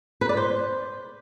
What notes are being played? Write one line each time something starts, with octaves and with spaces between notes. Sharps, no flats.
B4
D5
C5